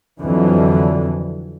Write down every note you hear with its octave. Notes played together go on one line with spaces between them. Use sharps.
F2 D3 E3 F#3